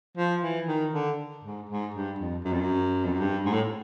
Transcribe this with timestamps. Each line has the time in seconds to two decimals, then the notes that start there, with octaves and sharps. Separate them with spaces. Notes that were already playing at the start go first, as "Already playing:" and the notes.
0.17 F3
0.43 E3
0.68 D#3
0.93 D3
1.44 G#2
1.70 G#2
1.94 G2
2.19 F2
2.44 F#2
2.53 F2
2.61 F#2
3.05 F2
3.13 F#2
3.20 G2
3.45 G#2
3.53 A2